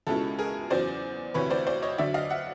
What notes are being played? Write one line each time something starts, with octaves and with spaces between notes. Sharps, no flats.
C#2 B2 G#3 C#4 E4 A4
G#4 A#4
E2 C#3 F#3 C5 D5
D2 C3 E3 B4 C#5
C5 D5
C5 D5
C#5 D#5
D2 D3 F#3 D5 E5
D#5 F5
E5 F#5